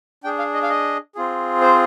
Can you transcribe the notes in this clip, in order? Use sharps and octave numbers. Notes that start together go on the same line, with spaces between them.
D4 G#4 G5
F5
D#5
F5
D#5
C4 F4 G#4
C5